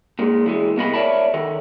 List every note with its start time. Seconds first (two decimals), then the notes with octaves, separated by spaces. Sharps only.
0.19 A#2 G#3
0.44 E2 E3 G#3
0.77 C2 B3 A#4 D#5 F5 B5
0.94 A#4 C#5 D5 E5 A5 B5
1.34 D#3 A4 A#4